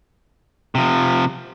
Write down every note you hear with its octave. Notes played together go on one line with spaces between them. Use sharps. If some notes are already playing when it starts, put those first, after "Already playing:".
C3 F3